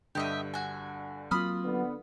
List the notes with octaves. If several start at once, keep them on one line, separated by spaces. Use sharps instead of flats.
G2 D3 G4 D#5 E5
F#4 G#5
F#3 A#3 C4 F4 B5 D#6 F6
D3 B3